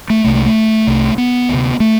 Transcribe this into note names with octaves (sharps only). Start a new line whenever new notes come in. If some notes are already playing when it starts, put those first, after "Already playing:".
A3
C2 C3 A3
A3
A3
C2 C3
B3
D2 C3
A3